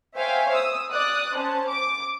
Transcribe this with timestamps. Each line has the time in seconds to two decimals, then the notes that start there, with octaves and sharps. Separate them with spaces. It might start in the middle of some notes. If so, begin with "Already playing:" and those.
0.17 C5 C#5 E5 F5 G5 G#5
0.52 D#6 E6
0.92 D5 D#6 F#6
1.34 C#4 C5 A5
1.69 D6